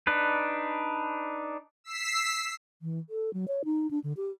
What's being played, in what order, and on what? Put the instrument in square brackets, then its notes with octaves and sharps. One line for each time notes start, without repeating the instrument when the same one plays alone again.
[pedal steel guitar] D4 D#4 B4
[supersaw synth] E6 B6 C7
[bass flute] E3
A4
F#3
C#5
D#4
D4
D3
G4